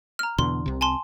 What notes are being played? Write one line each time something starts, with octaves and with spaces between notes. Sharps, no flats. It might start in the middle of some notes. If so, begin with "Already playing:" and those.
A#5 F6
E2 B2 D3 C6
C2 C3
G#5 A5 C6